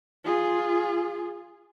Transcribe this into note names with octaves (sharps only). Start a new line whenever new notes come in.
F4 G#4